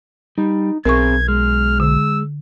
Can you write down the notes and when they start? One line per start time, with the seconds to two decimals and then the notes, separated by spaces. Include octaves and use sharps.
0.38 G3 D#4
0.85 B1 C4 G#4 A#4 C#6 G#6
1.28 G#3 F6
1.80 D3 E6